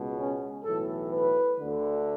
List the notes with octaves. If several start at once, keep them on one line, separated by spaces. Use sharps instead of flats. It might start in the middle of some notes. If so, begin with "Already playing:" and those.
Already playing: C#2 B2
C#4
B1 A2 E3 A4
B4
D2 D3